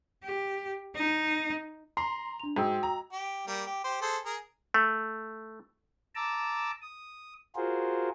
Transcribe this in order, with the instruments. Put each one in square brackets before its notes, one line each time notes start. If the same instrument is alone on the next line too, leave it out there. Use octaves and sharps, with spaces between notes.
[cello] G4
D#4
[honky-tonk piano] A#5 C6 [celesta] C7
[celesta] D4 F7
[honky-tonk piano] G#2 [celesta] F#4 G5 E6
[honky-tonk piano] A#5
[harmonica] G4
G3 A#3
G4
G4 C5
G#4 A4 C5
G#4 A#4
[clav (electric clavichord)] A3
[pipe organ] A5 A#5 D6 E6
D#6
F4 F#4 G#4 A#4 C5